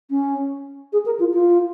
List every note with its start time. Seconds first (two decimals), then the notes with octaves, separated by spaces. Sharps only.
0.10 C#4
0.93 G#4
1.05 A#4
1.19 F4
1.33 F4